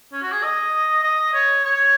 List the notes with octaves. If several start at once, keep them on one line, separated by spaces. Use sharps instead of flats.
C#4
F#4
G#4
D#5
D#5
C#5
C#5